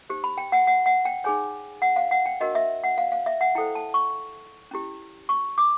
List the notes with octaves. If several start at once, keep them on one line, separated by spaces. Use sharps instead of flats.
D#4 G4 C5
B5
G5
F#5
F#5
F#5
G5
D#4 G#4 C#5 G#5
F#5
F5
F#5
G5
D4 F#4 A#4 D#5
E5
F#5
F5
F5
E5
F#5
E4 A4 C5 G5
A5
C#6
C#4 E4 G4
C#6
D6